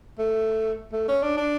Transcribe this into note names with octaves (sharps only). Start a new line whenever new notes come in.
A3
A3
C#4
D4
D4